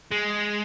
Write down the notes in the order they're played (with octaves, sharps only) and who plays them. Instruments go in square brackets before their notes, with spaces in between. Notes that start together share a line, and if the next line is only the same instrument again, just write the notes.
[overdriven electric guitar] G#3